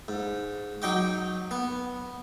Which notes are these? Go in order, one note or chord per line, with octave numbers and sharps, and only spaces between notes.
G#2
F#3 D#4 G5 D6
B3